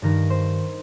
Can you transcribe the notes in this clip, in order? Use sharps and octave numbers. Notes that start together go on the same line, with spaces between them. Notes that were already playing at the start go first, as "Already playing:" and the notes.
G2 D#3 A#4 A#5
C5